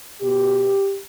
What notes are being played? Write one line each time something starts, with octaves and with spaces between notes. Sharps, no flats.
B2 G4